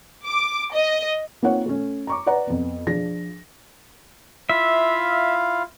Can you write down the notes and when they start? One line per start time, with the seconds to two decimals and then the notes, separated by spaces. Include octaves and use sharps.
0.25 D6
0.73 D#5
1.43 A#3 C4 D#4 F4 C#5 F#5
1.66 A3 C#4
2.07 A#5 C#6 D6
2.26 B4 D5 F#5 A#5
2.47 F2 B3
2.87 F3 D4 G#4 A#6
4.50 E4 F4 E5 F5